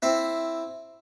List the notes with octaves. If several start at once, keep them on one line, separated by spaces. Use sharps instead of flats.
C4 E4